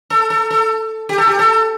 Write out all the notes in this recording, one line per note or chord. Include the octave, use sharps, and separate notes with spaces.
A4
A4
A4
G4
A4
G4
A4